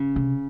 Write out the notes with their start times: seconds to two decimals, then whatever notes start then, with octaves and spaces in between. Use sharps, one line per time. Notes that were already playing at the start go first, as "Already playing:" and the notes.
Already playing: C#3
0.16 C3